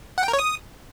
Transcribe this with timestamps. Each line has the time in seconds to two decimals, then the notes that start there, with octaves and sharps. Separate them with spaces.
0.18 F#5
0.23 G5
0.28 A#4
0.33 C#5
0.39 D#6